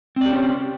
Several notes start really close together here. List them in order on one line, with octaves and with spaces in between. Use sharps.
C4 D5 G4 C#4 C5